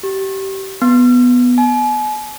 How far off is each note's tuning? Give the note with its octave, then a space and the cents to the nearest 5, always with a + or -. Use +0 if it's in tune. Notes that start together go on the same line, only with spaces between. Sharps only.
G4 -25
B3 +0
G#5 +45